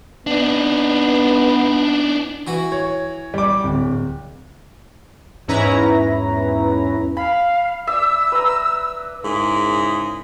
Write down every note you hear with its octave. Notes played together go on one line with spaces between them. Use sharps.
B3 D4 D#4
E3 F#4
C#5
G3 D6
D1
E2 G#2 C#4 E4 B4 A#5
F5 B5
D5 E5 E6
B4 A#5
G#2 C#3 E4 G#4 A#4